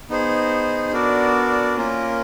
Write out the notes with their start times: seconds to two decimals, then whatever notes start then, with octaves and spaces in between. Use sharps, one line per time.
0.09 B3 D#4 G#4 C5
0.92 B3 D4 F#4 A#4 D5
1.76 A#3 C#4 F4 A#4